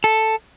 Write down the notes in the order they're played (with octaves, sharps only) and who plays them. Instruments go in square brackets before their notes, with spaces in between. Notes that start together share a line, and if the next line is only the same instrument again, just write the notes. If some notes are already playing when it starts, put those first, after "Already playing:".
[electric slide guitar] A4